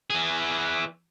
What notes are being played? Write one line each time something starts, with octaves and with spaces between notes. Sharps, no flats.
E3 G#4